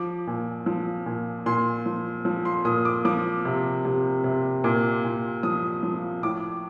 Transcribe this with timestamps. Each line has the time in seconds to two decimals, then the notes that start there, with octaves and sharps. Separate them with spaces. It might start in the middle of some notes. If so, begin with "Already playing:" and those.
Already playing: F3 D6
0.27 A#2
0.66 F3
1.06 A#2
1.46 A#2 C6
1.86 F3
2.25 F3
2.45 C6
2.65 A#2 D#6
2.85 D6
3.05 F3 D6
3.45 C3
3.85 C3
4.24 C3
4.64 A#2 D6
5.04 A#2
5.43 F3 D#6
5.83 F3
6.23 A2 D6